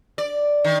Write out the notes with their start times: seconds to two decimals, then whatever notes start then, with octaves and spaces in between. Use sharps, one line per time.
0.18 D5
0.64 D#3